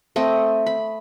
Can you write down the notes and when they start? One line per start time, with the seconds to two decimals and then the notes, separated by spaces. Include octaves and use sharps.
0.16 A3 C4 D#5
0.66 B5